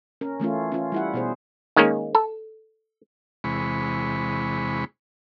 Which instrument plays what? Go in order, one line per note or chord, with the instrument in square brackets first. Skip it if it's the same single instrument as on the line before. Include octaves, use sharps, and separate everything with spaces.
[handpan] C#4 A#4
E3 A3 C#4 F4
C#4 F4
G3 E4 F#5
B2 G#4 C5
[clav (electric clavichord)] D#3 G#3 A#3 C#4
A4
[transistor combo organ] E2 C3 G#3 B5 C#6